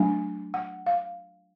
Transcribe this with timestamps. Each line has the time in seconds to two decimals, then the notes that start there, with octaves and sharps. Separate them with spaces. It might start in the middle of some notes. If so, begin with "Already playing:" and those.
Already playing: F#3 A3 D4 G#5
0.54 F#5
0.86 F5